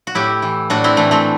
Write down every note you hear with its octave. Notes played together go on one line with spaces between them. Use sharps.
F#4
A2 E4 G4
E3
A2 D4 F#4
C4 E4
E3 A3
A3 C4